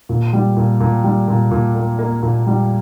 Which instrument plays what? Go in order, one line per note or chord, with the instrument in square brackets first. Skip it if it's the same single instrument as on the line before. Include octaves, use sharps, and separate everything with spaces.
[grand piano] A#2
G3
A#2
A#2
G3
A#2
A#2
A#3
A#3
A#2
G3